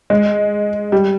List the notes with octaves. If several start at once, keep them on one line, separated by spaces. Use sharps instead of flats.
G#3
G3